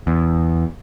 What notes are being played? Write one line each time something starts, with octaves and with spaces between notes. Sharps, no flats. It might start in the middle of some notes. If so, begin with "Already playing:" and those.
E2